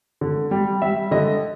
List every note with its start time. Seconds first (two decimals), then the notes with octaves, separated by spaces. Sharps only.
0.21 D3
0.51 G3
0.82 G3 E5
1.11 D3 D#5